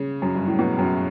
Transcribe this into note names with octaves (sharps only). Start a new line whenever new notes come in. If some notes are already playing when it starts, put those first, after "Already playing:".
Already playing: C#3
F#2
G2
A2
B2
F#2